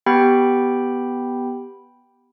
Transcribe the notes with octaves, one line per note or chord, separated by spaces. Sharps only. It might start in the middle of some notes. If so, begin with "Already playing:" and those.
B3 G4 G5 B5